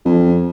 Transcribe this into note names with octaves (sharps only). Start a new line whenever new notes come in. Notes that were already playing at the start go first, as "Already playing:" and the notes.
F2